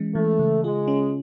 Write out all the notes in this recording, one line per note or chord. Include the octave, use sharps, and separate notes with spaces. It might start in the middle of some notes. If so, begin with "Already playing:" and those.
Already playing: E3 G#3 C#4
E3 A3
C#3
G#3 F4
C#4